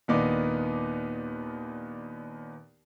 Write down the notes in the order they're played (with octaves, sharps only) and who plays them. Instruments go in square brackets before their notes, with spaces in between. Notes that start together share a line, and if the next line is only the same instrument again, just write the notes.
[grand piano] D#2 A#2 B3 D4 D#4 D6